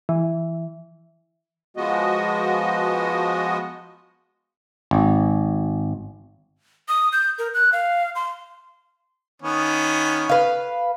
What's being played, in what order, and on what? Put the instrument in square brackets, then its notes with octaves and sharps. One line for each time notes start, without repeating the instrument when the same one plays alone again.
[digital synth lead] E3
[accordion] F3 G#3 B3 F#4 D#5
[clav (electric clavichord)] G#1
[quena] D#6
G6
A#4
F#6
F5
C6
[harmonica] D#3 B3 C#4
[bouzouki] B4 F5